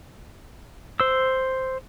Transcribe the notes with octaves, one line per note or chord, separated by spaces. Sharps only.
C5 E6